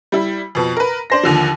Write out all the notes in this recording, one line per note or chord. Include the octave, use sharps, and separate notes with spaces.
G3 E4
F2 B2
A#4 B4
D4 C5 A#6
D#2 D3 F3